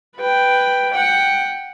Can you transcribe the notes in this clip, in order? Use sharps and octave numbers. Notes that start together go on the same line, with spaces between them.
B4 G5
F#5 G5